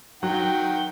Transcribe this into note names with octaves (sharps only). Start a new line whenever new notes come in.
D#3 F#3 F#5 G5